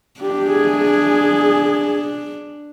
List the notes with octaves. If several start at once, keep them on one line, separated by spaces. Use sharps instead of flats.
D4 G4
G#4
G#4